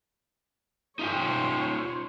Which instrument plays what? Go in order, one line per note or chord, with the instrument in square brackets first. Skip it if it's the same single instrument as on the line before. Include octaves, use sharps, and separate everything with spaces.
[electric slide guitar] D#4 F4 G5 [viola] C5 C#5